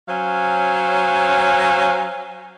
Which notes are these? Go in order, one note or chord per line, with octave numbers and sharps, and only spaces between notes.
F#3 C#4 C5 F5